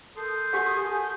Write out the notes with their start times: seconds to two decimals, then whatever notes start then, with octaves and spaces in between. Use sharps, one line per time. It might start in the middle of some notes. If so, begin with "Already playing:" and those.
0.16 A4 A#4 C6 D#6 G6
0.53 F#4 G4 F#5 G#5
1.02 G6